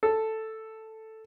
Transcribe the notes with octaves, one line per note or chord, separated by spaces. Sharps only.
A4